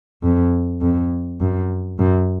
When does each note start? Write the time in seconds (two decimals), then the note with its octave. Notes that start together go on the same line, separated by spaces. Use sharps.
0.23 F2
0.81 F2
1.41 F#2
1.99 F#2